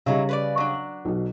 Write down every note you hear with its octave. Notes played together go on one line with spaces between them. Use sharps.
C#3 F#3 G3 D#4 E4
B4 C5 D5
F#3 D4
B1 B2